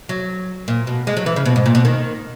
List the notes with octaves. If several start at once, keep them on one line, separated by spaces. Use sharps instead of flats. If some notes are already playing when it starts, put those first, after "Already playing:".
F#3
A#2
B2
G#3
F#3
E3
C#3
B2
G#2
A#2
B2
D#3